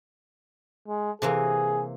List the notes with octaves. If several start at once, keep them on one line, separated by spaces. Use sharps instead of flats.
G#3
C3 E3 A#3 G#4